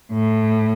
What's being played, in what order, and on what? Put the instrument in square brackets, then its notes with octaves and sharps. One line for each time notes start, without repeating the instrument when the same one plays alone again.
[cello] A2